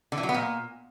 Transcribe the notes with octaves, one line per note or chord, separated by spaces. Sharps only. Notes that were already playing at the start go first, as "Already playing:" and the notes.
D3
E3
F#3
B3
A#2